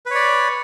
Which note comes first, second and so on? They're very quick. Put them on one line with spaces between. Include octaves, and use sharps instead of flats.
B4 C#5 D5